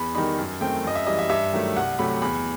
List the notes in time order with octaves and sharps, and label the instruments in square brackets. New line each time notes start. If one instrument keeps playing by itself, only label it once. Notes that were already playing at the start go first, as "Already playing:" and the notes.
Already playing: [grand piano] E2 B5
D#3 G3 D#4 B5
F#2
D#3 A3 C4 G5
F#2 D#5
E5
E3 G3 D#5
E5
G2 E5
D#3 F#3 A3
C2 F#5
C3 F#3 A3 B5
E2 B5